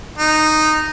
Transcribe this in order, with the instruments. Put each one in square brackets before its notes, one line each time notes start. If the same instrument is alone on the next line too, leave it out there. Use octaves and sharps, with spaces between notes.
[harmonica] D#4